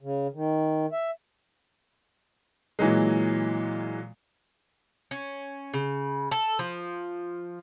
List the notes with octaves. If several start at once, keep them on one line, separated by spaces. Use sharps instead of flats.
C#3
D#3
E5
A#2 E3 F#3 G#3
C#4
C#3
A4
F3